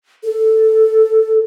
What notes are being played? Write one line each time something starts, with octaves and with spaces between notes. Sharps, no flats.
A4